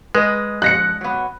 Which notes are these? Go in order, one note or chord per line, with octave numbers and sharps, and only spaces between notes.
G#3 B4 D#5
F3 F#6 A#6 C#7
F#3 B3